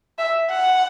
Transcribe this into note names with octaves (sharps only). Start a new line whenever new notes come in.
E5
F#5